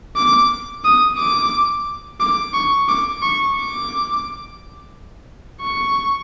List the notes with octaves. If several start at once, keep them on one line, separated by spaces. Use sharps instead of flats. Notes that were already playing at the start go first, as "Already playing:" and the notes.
D6
D#6
D6
D6
C#6
D6
C#6
D6
C#6